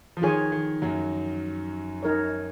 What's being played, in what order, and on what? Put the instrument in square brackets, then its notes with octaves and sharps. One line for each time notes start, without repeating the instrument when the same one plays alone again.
[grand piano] F3
[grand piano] D#3 [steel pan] F4 G#4 C#5 G#5
[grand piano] D#3
F#2 F#3
[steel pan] D#4 A#4 C#5